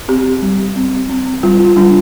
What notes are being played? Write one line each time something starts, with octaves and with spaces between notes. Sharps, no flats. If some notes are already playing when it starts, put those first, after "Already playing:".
C4 G4
G3
C4
C4
G3 F4
F4
G3 D4